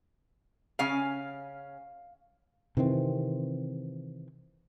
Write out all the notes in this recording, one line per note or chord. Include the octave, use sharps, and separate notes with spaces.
C#3 C#4 F5 G#5
C3 D#3 E3 C4